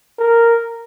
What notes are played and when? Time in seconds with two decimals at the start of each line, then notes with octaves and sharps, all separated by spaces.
0.18 A#4